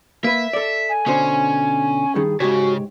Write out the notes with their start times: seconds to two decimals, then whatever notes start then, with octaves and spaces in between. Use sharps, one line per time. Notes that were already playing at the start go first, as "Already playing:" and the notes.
0.24 A#3 B4 E5
0.53 A4 D5
0.89 G#5
1.07 B2 D3 C#4 C5
2.15 G2 D#3 G#4
2.40 G#2 C#3 F#4 G4 C#5